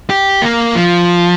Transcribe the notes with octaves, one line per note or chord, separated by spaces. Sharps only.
G4
A#3
F3